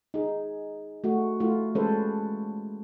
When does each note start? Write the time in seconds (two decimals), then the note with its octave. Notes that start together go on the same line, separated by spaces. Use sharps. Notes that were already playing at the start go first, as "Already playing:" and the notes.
0.14 D#4 G#4
1.04 A3 F#4
1.40 A3 E4 F4
1.75 E3 G#3 C#4 A4 B4 C5